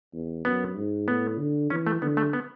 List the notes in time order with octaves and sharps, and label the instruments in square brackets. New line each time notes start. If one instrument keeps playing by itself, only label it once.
[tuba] E2
[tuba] F#2 [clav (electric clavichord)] B3
[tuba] G#2
[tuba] A2 [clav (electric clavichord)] B3
[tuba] D3
[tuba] E3 [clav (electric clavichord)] C#4
[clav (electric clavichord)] A3
[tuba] D3 [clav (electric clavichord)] B3
[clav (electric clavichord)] A3
B3